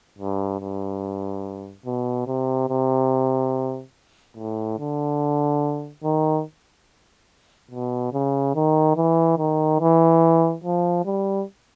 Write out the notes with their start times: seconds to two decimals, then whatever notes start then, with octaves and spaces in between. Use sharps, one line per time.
0.19 G2
0.61 G2
1.86 B2
2.27 C3
2.69 C3
4.37 A2
4.79 D3
6.04 D#3
7.71 B2
8.13 C#3
8.55 D#3
8.96 E3
9.39 D#3
9.80 E3
10.64 F3
11.06 G3